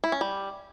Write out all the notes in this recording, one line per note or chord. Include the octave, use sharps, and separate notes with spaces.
E4
C#4
G3